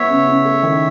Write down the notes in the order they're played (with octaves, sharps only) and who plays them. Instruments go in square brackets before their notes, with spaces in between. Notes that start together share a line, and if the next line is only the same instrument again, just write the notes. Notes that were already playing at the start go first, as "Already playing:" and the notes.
Already playing: [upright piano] B3 [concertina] C#5 E5
[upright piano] C#3
C#3
A3
D#3